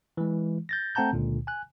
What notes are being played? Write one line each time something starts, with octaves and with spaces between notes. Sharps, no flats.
E3 G#3
G6 A6 A#6
A3 C4 F#5 A5 A#5 G6
C#2 A#2 D3
G#5 F#6